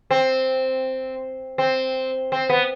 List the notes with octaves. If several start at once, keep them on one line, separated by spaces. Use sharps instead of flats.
C4
C4
C4
B3